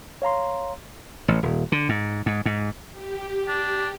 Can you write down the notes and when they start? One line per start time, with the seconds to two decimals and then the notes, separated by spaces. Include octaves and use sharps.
0.22 C#5 F5 A#5 C6
1.28 A1
1.43 D#1
1.72 D3
1.89 G#2
2.26 G#2
2.45 G#2
2.92 G4
3.48 D4